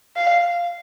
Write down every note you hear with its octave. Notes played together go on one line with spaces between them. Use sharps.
F5